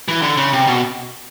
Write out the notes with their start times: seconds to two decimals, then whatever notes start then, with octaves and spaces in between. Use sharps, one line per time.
0.08 E3
0.22 D3
0.37 C#3
0.53 C3
0.67 B2